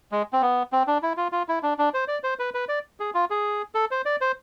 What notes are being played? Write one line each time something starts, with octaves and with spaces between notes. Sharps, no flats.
G#3
C4
B3
C4
D4
E4
F4
F4
E4
D4
D4
C5
D5
C5
B4
B4
D5
G#4
F4
G#4
A4
C5
D5
C5